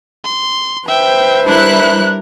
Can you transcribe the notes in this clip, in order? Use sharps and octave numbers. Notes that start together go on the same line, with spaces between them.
C6
B4 C5 E5 G5
G3 D4 E4 A#4 F#6